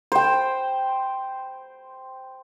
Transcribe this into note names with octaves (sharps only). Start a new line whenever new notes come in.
C5 G5